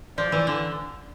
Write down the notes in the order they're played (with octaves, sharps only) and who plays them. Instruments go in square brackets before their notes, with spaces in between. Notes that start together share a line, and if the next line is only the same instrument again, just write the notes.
[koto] F3 [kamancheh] D5
[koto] E3
D3